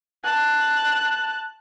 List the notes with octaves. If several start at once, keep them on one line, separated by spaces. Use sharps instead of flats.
A5 F#6